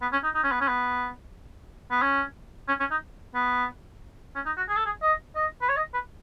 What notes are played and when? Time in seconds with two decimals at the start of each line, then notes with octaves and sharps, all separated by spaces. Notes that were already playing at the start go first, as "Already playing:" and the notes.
0.02 B3
0.12 C#4
0.24 D#4
0.35 D#4
0.43 C#4
0.51 B3
0.60 C#4
0.68 B3
1.91 B3
2.02 C#4
2.68 C#4
2.80 C#4
2.91 D#4
3.34 B3
4.35 C#4
4.46 D#4
4.57 F#4
4.68 G#4
4.76 A4
4.86 G#4
5.02 D#5
5.35 D#5
5.62 B4
5.69 C#5
5.76 D#5
5.93 B4